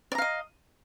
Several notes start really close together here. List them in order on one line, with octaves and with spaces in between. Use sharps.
D5 A#5 F5 D#5